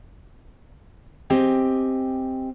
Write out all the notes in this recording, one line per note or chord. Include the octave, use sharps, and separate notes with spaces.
C4 G4 D#5 G#5